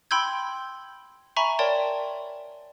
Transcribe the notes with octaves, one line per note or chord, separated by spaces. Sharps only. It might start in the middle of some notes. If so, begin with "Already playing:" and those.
G5 B5 C6 E6 G6 G#6
E5 G#5 A#5 B5 C#6
A#4 C#5 D5 G5 A5 C6